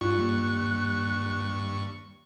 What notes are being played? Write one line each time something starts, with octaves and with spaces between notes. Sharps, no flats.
G2 F4 C#6 F#6
D#1